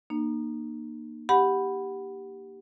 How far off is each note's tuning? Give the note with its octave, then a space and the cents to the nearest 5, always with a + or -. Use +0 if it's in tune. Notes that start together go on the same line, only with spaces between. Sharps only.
A#3 +10 D#4 -35
G4 +0 F#5 +0 B5 +0